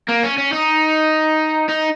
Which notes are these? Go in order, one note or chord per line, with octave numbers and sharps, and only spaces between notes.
A#3
C#4
C#4
D#4
D#4